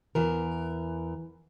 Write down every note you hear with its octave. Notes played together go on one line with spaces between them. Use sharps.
E2 E3 A#4